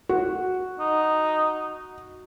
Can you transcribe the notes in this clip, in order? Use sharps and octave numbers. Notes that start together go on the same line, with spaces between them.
F#4
D#4